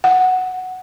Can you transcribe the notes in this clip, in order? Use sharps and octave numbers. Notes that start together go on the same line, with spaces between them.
F#5